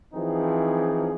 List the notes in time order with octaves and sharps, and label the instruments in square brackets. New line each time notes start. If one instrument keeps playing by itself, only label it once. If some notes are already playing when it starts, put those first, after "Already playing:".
[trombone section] E3 F3 C4 D#4 G#4